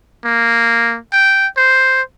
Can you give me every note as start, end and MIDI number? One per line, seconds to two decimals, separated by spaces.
0.25 0.98 58
1.13 1.47 79
1.57 2.02 72